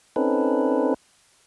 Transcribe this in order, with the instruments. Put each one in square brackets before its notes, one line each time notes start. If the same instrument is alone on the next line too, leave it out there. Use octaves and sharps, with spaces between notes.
[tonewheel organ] C4 C#4 D#4 A4 B4